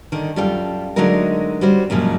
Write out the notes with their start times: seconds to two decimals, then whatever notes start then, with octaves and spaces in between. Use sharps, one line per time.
0.12 D3 D#3
0.36 F#2 G3 F4 A4 G5
0.96 D3 F#3 G#3 A3 D#4 A#4
1.61 G3 C#4 F#4 C5
1.90 F#2 A#2 C#3 F3 G#3